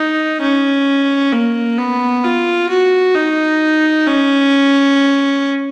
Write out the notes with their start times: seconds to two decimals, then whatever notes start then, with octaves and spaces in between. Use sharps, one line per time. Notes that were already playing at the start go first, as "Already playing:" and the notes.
Already playing: D#4
0.41 C#4
1.33 A#3
1.79 B3
2.25 F4
2.70 F#4
3.15 D#4
4.07 C#4